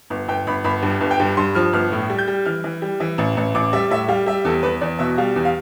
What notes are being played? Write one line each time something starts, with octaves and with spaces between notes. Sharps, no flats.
G1
G1 G5
G1 B5
G1 B5
G2
G1
G5
G2
G2 C6
F3 F6
G1 F6
A2
G3
G6
G3
E3 F6
E3
G3
E3
A1
A1
A1 D6
G3 E5
A2 E5
G3 F5
G3 E5
E2 A4
E2 B4
E2 D5
B2 E5
G3 F5
E2
F5